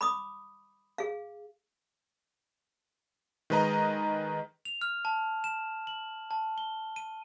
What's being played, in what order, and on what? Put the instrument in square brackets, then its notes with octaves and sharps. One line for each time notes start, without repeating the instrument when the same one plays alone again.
[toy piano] B5 D6 D#6
G#4 F5
[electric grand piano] D#3 G#3 B4 D#5 A#5
[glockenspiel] F7
F6
A5
E7
F#7
A5
G7
D#7